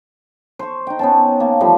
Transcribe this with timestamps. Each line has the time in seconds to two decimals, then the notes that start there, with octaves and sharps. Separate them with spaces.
0.59 C5 C#6
0.87 D#4 G5
0.99 B3 C#4 A5
1.40 A#3 A5
1.60 E3 F3 G3 A3